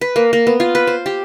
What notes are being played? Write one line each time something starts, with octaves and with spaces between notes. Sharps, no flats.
B4
A#3
A#3
B3
F4
B4
C5
G4